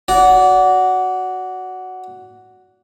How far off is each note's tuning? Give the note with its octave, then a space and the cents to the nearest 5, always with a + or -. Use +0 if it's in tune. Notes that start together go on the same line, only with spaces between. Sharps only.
F#4 +0 D5 -30